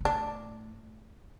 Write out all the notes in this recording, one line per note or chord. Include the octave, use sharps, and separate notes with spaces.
A#2
A2 D4